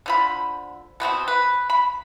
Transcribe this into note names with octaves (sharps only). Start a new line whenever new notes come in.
D3 F3 B5
B2 B3 C4 F#4
B4
B5